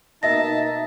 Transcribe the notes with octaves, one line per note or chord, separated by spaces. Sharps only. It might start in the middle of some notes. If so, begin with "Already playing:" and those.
B2 A#3 D#4 D#5 E5 A5 A#6